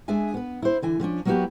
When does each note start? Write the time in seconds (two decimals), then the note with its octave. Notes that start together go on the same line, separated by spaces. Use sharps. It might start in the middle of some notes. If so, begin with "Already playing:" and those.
0.08 G#3 D4 G#4 E5 G#5
0.34 B3 B4
0.62 E4 C5
0.82 D3 E3 G#5
1.00 D3 F3 C#4 D4
1.25 F#3 A#3 B3 E4 F#4 G4